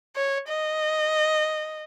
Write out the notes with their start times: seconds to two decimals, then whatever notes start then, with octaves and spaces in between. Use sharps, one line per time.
0.16 C#5
0.48 D#5